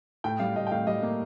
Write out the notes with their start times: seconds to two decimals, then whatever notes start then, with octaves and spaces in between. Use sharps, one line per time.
0.24 A2 G5
0.39 G3 F5
0.56 A2 D#5
0.67 G5
0.71 A2 F5
0.87 G3 D#5
1.02 A#3